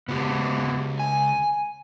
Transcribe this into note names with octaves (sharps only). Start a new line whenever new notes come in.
C#2 B3 F#4 G4
G#5